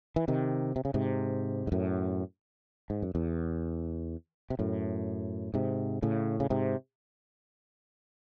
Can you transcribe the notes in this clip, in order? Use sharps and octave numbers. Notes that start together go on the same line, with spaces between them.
E3
C3 D#3
C3
C#3
G#2 C3
G#2
F#2 A2
G#2
F#2
E2
C3
F#2 A2
G#2 C3
A2 C#3
C#3
G#2 C3